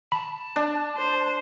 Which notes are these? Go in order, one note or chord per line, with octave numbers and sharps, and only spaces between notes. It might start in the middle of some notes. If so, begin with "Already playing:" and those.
A5 B5
D4
C5